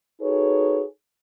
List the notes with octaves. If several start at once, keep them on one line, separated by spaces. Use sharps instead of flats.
D#4 F#4 G#4 A4 B4 C#5